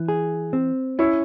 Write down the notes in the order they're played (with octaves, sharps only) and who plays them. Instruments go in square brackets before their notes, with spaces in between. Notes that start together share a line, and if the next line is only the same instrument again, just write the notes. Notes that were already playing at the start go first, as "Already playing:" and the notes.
Already playing: [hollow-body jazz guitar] E3
G#4
C4
[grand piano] C#4 E4 [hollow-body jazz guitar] C#5